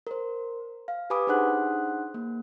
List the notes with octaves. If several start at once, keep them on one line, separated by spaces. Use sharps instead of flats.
A#4 C5
F5
G4 B4 G#5 B5 D6 D#6
D4 D#4 G#4 C5 F#5 F#6
A#3